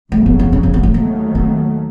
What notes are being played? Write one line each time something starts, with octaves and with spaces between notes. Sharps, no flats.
F1 F2 C#3 F#3 A3
B3
C4
C#4
C4
A#3
A3
D#2 D#3 F#3 A3 A#3
C4